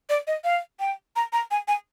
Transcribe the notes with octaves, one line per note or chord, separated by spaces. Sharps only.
D5
D#5
F5
G5
A#5
A#5
G#5
G#5